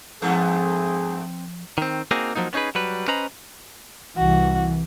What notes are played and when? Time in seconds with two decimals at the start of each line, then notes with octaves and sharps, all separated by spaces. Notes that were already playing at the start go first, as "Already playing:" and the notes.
0.22 G2 F3 A3 B3 C4 G#4
1.78 D#3 C4
2.11 A#3 C4 D#4 F#4 G#4
2.35 F3 F#3 A#3 D#4
2.53 B3 C#4 D#4 G#4 B4
2.75 F#3 G3 B4
3.08 C#4 B4 C5 D#5 A#5 B5
4.17 C2 E3 F#4